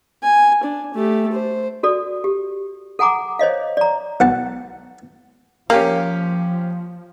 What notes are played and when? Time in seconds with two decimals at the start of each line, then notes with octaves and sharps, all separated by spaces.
0.22 G#5
0.63 D4
0.94 A3 G4
1.32 C5
1.83 F#4 A4 D5
2.24 G4
2.99 A4 F#5 G#5 A#5 D6
3.39 C5 C#5 D#5 F5
3.77 D5 A#5
4.20 B1 F#5 A5
5.70 F3 A#3 C#4 G4 F5